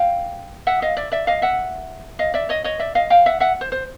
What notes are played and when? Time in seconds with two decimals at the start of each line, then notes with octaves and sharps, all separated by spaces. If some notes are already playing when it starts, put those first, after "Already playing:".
Already playing: F5 G5
0.67 E5 F#5
0.82 D#5 F5
0.97 D5 E5
1.12 D5 E5
1.27 D#5 F5
1.42 E5 F#5
2.19 D#5 F5
2.34 D5 E5
2.49 C#5 D#5
2.64 C#5 D#5
2.79 D5 E5
2.95 D#5 F5
3.10 F5 G5
3.26 E5 F#5
3.40 E5 F#5
3.61 C5
3.72 C5